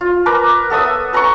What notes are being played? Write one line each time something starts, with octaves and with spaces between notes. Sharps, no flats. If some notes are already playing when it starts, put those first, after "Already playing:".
F4
A#4 B4 A#5 D6
B3 A4 E5 D#6
B4 A#5 B5 C#6